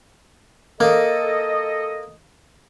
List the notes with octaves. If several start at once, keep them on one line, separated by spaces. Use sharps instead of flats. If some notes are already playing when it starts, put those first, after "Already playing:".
A#3 A4 D#5